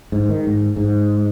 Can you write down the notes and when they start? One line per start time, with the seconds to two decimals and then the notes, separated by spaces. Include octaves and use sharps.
0.12 G#2
0.29 D#3
0.47 G#2
0.76 G#2